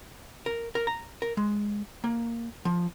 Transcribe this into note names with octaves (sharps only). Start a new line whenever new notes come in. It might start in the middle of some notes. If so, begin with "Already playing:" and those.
A#4
A#4
A#5
A#4
G#3
A#3
F3